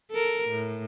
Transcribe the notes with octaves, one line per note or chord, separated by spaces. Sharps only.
A4 A#4
A2